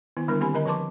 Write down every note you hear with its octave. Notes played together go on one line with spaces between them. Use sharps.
D#3 B3 E4
D3 G3 B3 D4 E4 A#4
D#3 A#3 C4 G4 G#5 B5
D3 A#4 D#5 A#5
F3 B4 A5 C6 D6